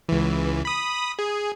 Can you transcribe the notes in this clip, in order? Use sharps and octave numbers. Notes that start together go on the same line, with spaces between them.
C#2 E3
B5 D#6
G#4